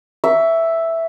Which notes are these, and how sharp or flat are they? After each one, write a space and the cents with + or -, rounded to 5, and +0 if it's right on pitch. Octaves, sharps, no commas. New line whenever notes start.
E5 +0 C#6 +30